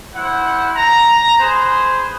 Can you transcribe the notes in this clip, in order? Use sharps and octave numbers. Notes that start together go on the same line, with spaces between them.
E4 C5 F#5
A#5
G#4 B4 C5